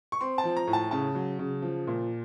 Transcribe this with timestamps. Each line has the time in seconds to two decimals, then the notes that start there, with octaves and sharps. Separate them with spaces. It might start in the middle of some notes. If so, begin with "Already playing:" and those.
0.12 C#6
0.21 C4 C6
0.38 A5
0.44 F3
0.57 A#5
0.67 A2
0.73 A5
0.91 C#3 A5
1.15 F#3
1.39 C#3
1.62 F3
1.87 A#2